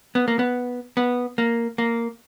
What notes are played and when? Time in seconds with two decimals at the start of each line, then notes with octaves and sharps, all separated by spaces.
0.15 B3
0.28 A#3
0.39 B3
0.97 B3
1.38 A#3
1.78 A#3